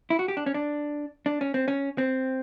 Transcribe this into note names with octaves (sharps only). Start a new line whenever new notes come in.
E4
F#4
G4
D4
C#4
D4
D4
C#4
C4
C#4
C4